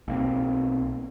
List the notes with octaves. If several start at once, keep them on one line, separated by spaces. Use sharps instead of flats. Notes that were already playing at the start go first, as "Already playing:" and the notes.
B1 A#3 C4